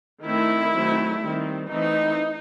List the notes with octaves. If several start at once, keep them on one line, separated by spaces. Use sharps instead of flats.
D#3 A3 C4 E4
D#3 F#3 A3 C4
D#3 G3 C4
E3 A3 C4 D#4